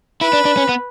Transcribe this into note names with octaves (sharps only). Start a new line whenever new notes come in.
E4 B4
D4
D4
C#4
B3